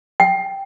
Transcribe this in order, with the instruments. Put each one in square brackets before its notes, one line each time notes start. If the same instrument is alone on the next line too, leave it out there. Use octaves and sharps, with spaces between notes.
[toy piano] G5